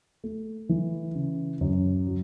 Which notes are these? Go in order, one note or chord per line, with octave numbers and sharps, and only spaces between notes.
A3
E3
C#3
F#2
F#3